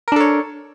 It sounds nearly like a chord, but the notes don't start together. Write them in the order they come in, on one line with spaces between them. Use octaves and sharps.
A#4 D4 A4 C#5